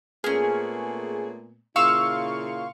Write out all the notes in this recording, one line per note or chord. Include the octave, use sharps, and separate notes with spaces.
A#2 A3 B3 C#4 G#4 F6
A#2 C#3 E4 F5 C6 C#6 E6